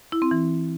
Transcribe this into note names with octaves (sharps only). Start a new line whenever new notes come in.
E4
C4
E3